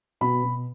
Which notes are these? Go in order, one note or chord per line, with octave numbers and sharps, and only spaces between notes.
B2 B5
B2